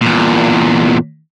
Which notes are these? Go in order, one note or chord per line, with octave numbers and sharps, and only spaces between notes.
E2 A#2